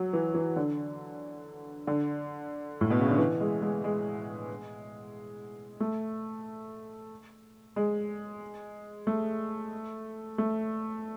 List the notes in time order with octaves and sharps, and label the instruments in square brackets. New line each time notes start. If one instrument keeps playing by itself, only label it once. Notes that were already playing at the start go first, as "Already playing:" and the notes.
Already playing: [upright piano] F#3
E3
E3
D3
D3
A2
B2
C#3
D3
E3
G#3
G#3
G#3
A3
G#3
A3
A3